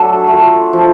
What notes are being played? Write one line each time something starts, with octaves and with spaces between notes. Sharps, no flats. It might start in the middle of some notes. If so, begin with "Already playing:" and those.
Already playing: F#3 A3 D4 A4
A3 F4
F3